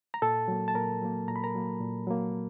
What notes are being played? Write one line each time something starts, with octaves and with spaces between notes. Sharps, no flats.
A#5
A#2 A4 A5
F#3 A#3
A5
A#2 A#4 A#5
F#3 A#3
A#2 A#5
B5
A#4 A#5
F#3 A#3
A#2
F#3 A#3